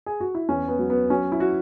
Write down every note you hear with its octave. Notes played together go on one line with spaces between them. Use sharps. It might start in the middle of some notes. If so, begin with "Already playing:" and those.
G#4
F#4
E4
E2 C#4
B3
F#3
B3
F#3 C#4
E4
F#4